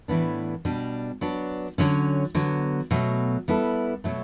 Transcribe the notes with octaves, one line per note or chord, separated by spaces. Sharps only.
A2 E3 B3 D4
B2 G3 D4
F#3 B3 D4
D3 F#3 C#4
D3 F#3 B3
B2 F#3 A3
G3 B3 E4 A4
B2 F#3 A3